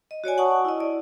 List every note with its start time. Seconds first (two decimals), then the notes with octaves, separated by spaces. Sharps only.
0.11 D#5
0.24 F#4 C#5 D5 G#5
0.38 F#5 A5 C#6 D#6
0.65 E4 D#5
0.80 D5